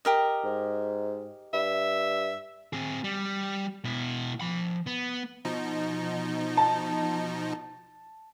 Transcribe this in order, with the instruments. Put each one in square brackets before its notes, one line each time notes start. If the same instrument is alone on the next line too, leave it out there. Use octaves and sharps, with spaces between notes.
[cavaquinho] G4 A#4 D#5
[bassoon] G#2
[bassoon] G2 [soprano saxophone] E5
[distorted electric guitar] C4 G#4
G3
B2 E4
F3 B5
B3
[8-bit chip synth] B2 F3 D#4
[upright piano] A5